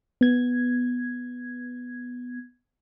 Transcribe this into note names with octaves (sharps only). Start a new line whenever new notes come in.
B3 G#6